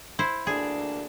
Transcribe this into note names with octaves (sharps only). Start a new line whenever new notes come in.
E4 C5
D2 A#3 D4 G#4